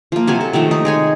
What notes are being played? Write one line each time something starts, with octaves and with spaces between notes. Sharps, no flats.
F3 A#3
C3 F#3 G#5
A4
C3 D#3 F3 A3
D#4
G#3 C#5 G#5